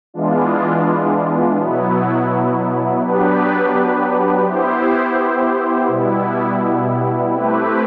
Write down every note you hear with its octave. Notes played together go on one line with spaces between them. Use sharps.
E3 G#3 B3 D4 F4
B2 F#3 B3 E4
F#3 B3 D4 G4 B4
B3 E4 G4 C5
B2 G3 B3 E4
A3 C4 E4 G4 B4